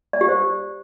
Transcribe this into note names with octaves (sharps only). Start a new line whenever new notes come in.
D5
G4
C5